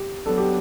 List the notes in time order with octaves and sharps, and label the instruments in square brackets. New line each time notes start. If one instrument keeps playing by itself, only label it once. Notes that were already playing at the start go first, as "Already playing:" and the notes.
Already playing: [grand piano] G4
[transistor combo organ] F#3 B3 D4 [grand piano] A4
[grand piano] G4